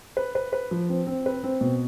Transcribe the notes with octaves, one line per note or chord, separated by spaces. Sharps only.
B4
B4
B4
F3
C4
C4
B4
C4
B2